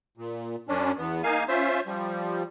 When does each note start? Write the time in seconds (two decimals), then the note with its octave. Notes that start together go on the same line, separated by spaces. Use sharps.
0.17 A#2
0.69 F#2 C#4 D4
0.98 E2 B3
1.23 A#3 D#4 F5 G#5
1.48 C#4 F4 C5 E5
1.86 F3 G3